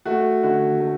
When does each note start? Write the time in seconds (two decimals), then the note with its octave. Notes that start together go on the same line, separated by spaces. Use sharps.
0.05 A3 F#4
0.43 D3 F#4
0.80 A3